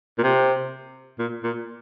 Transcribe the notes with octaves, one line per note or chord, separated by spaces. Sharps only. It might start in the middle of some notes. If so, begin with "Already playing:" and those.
A#2
C3
A#2
A#2